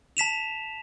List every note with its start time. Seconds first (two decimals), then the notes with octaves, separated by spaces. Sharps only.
0.17 A5 B6 E7 F7